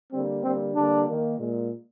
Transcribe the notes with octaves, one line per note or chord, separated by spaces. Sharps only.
D3 G3 A#3 C4
D3 G3 A#3 C4
D3 G3 A#3 D4
D#3 A#3
A#2 G#3